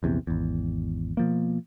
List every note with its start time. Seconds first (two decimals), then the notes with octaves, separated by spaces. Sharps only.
0.03 A#1 E2 C3
0.27 G#1 E2
1.17 B2 F3 A#3